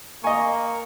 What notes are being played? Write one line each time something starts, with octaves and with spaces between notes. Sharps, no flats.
A#3 D#5 G#5 A#5 C#6